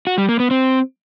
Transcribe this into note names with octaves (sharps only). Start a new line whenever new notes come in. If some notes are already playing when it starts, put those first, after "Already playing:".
F#4
G3
A#3
B3
C4